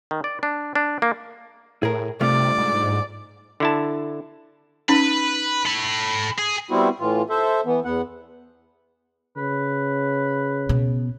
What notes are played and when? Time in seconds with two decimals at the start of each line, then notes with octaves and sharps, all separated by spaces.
0.11 D#3
0.24 D5
0.43 D4
0.75 D4
1.02 A#3
1.83 A2 G#4 A#4
2.21 G2 C3 A3 F4 D5
2.58 G#2
3.60 D3 E4 A5
4.89 C#4 D#4 B4
5.66 A4 B5
6.39 G#4
6.71 G3 B3 C4 E4 F#4
7.00 A2 E3 F4
7.29 A4 C5 E5
7.65 E3 B3
7.85 E2 B3 F#5
9.37 C#3 B4
10.69 B2